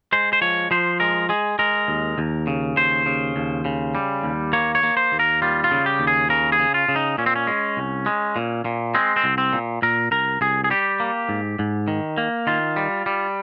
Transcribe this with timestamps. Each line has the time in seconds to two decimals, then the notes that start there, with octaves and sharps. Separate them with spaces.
0.12 G#3 C5
0.33 C5
0.41 F3 C#5
0.71 F3 C5
1.00 G#3 A#4
1.29 G#3 G#4
1.59 G#3 A#4
1.88 D#2
2.18 D#2
2.47 C#3
2.77 D#2 C5
3.06 C#3
3.36 D#2
3.65 C#3
3.95 G3
4.23 D#2
4.53 A#3 C#5
4.75 C#5
4.83 A#3
4.97 C5
5.12 D#2
5.20 A#4
5.42 G3 F4
5.64 F4
5.71 C#3
5.86 G4
6.00 D#2
6.07 G#4
6.29 C#3 A#4
6.52 G#4
6.60 C#3
6.74 F4
6.89 C#3
6.96 D#4
7.18 A#2 C#4
7.26 C4
7.36 C#4
7.47 G#3
7.77 C2
8.06 G#3
8.36 A#2
8.65 A#2
8.95 G#3 C4
9.16 C4
9.24 C2
9.38 C4
9.53 A#2
9.82 A#2 A#4
10.11 C2 A#4
10.41 C2 G#4
10.64 G#4
10.70 G3 G4
11.00 A#3
11.29 G#2
11.59 G#2
11.88 D#3
12.18 A#3
12.47 D#3 F4
12.76 G3
13.06 G3